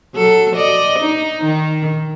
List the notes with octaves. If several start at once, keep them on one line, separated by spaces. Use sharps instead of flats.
F#3 A4
D5 D#5
D#4
D#3